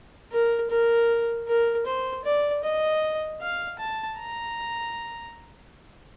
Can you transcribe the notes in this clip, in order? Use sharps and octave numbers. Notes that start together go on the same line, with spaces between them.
A#4
A#4
A#4
C5
D5
D#5
F5
A5
A#5